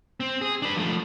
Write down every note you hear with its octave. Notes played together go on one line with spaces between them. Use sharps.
C4
G#4
D4 B4
F3 A3